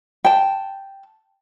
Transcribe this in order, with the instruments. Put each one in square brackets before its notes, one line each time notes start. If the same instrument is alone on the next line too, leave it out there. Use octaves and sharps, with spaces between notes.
[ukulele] G5 A5